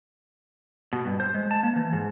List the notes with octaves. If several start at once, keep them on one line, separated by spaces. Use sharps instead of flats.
B2
G2
C5
G#3
A5
A#3
E3
G#2